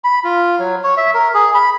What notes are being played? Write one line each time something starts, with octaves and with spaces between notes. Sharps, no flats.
B5
F4
F#3
C#5
E5
A#4
G#4
B5